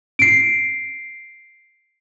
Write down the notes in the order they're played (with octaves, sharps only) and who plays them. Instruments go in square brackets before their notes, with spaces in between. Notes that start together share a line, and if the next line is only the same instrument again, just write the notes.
[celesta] C7 D7